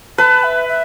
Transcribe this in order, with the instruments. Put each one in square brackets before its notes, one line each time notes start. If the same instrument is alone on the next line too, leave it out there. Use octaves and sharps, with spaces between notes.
[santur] B4 [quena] A5
[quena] E5
E5